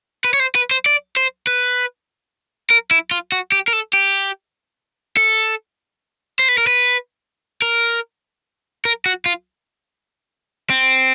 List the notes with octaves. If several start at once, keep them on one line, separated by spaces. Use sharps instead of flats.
B4
C#5
C5
B4
C5
D5
C5
B4
A#4
E4
F4
F#4
G4
A#4
A4
G4
A4
C5
B4
A#4
B4
A#4
A#4
F#4
F4
C4